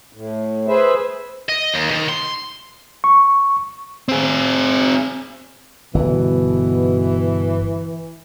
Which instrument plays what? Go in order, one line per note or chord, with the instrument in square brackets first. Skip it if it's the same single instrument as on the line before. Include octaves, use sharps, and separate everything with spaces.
[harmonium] A2
G#4 B4 C5 E5
[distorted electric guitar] D#5
D#2
D#3
C6
[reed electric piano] C#6
[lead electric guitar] C4 G#4
[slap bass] G1 [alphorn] B2 [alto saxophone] E3